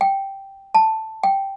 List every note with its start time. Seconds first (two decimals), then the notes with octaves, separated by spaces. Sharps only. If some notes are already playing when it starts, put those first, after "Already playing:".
0.01 G5
0.75 A5
1.23 G5